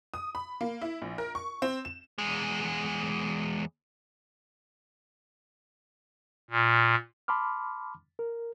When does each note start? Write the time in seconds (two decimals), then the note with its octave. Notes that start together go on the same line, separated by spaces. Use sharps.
0.14 D#6
0.35 B5
0.61 A#3
0.82 E4
1.02 A#1
1.18 A#4
1.35 C#6
1.62 C4
1.85 E7
2.18 E2 G#3
6.50 A#2
7.28 A5 B5 C6 D6 F6
8.19 A#4